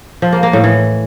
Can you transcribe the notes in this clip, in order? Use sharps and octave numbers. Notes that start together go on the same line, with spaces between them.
F3
A#3
A#3
A2
E3